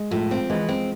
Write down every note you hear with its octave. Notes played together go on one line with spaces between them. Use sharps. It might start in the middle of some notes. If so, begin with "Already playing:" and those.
Already playing: G#3
A2 F3
C4
E3 G#3
C4